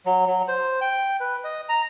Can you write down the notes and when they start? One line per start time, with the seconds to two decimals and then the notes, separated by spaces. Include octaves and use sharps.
0.06 F#3
0.27 F#3
0.48 C5
0.81 G5
1.20 B4
1.44 D#5
1.69 A#5